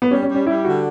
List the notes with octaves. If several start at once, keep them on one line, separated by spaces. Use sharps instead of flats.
B3
G3 C#4
C#4
G3
C#4
G3 E4
D3 F#4